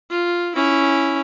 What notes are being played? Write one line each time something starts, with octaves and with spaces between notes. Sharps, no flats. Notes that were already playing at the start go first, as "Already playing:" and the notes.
F4
C#4 E4